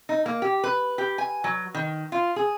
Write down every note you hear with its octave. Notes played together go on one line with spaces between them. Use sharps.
D#4
A#3
G4
B4
G4
G#5
F#3
D#3
F4
G#4